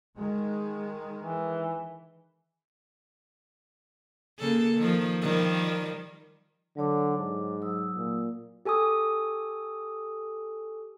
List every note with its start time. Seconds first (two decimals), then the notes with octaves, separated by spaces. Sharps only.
0.17 D#3 G#3
1.20 E3
4.39 C#3 A#3 A4
4.77 D#3 F3
5.22 D#3 F3 G3
6.77 D3 F#3 C#5 D6
7.18 G#2
7.62 F#3 D#6 E6
7.96 A#2
8.65 G4 A4 G#5 C#6 D#6